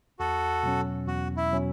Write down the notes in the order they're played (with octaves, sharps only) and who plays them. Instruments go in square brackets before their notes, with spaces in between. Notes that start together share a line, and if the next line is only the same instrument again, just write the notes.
[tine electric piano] E2 [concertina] F#4 A4
[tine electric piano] B2 F#3 C#4
[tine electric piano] E2 [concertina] F#4
[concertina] E4
[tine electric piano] B2 F#3 C#4